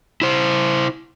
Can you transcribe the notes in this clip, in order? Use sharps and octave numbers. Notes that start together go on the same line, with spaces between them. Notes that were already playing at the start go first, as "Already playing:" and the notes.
E4 C5